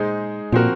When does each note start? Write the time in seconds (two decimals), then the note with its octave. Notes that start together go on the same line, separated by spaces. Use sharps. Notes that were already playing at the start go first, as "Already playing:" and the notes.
Already playing: A#2 G#3 D#4 G#4 C5
0.52 A#2 F3 C4 F#4 A#4